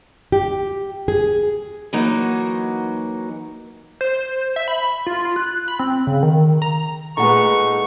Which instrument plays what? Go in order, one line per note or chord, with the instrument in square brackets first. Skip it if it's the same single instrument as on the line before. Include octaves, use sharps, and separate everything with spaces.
[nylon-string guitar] G4
G#4
[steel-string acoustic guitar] E3 F#3 A#3 D#4 F#4
[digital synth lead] C5
E5
B5
F4
F4
F#6
B5
C4
C#3
D#3
A#5
[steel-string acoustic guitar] A#2 A3 D#4 [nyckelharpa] G#3 B4 [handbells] F#5 A#5 [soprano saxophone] C#6